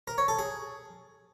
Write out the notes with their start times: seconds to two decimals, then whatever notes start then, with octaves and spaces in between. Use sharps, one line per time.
0.08 A#4
0.18 C#5
0.28 A4
0.39 G#4